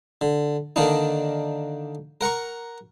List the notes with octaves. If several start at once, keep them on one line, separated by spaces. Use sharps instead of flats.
D3
D3 D#3 A#3 D4 D#4
A#4 F#5 A#5 C#6